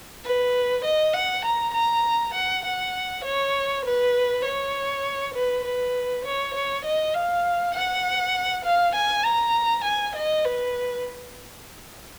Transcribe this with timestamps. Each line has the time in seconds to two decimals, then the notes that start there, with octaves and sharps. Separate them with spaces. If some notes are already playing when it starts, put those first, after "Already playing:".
0.24 B4
0.84 D#5
1.14 F#5
1.45 A#5
1.74 A#5
2.34 F#5
2.65 F#5
3.24 C#5
3.85 B4
4.45 C#5
5.34 B4
5.64 B4
6.25 C#5
6.54 C#5
6.85 D#5
7.14 F5
7.74 F#5
8.64 F5
8.95 G#5
9.25 A#5
9.84 G#5
10.15 D#5
10.44 B4